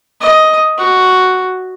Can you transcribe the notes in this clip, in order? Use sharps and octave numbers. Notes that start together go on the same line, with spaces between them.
D#5
F#4